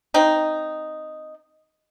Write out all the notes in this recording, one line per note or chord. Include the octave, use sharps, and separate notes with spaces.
C4 D#4